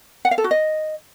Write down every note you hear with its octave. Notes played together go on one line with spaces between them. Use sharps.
F#5
F5
A4
F#4
D#5